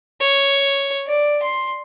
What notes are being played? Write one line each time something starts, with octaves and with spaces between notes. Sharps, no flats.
C#5
D5
C6